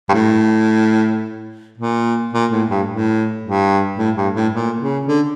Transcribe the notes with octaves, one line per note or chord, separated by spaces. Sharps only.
G2
A2
A#2
A#2
A2
G2
A2
G2
A2
G2
A2
A#2
C#3
D3